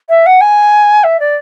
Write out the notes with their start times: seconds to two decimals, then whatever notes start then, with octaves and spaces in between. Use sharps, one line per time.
0.09 E5
0.26 F#5
0.41 G#5
1.04 E5
1.20 D5